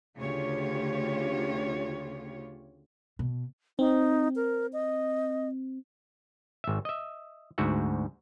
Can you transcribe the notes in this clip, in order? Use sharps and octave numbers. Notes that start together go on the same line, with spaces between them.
D2 C#3 F4 G4 C#5
B2
C4 D#4
A#4
D#5
G#1 E5
D#5 E5
D2 G#2 F#4 E5 F#5